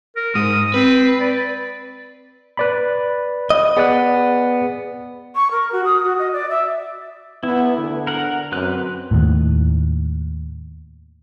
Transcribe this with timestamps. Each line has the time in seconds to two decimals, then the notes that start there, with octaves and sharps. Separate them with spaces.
0.16 A#4
0.35 G#2 D#6
0.74 C4 B4
1.20 D5
2.57 B4 D5 B5
3.50 D#5
3.77 B3 G#4 D5 F#6
5.35 C#6
5.52 A#4
5.72 F#4
5.85 D#6
6.04 F#4
6.19 D#5
6.33 D5
6.50 E5
7.43 B3 E4
7.78 D3
8.07 A#4 F#5
8.52 F#2 C4 B4 F#6
9.11 D#2 A2